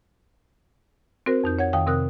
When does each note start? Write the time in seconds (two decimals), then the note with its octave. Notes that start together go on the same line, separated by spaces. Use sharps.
1.26 C4 F#4 A#4 C5
1.44 F2 D#4 G6
1.59 C#5 F#5 G#6
1.73 F2 D#3 F5 G5 D#6
1.87 C3 C4 A#4 D#6 F#6